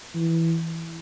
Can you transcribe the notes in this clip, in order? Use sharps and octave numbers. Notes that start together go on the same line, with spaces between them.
E3